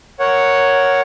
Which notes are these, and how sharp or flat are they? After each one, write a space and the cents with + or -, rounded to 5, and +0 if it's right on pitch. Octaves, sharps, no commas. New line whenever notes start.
A#4 +0 C#5 +0 F#5 +0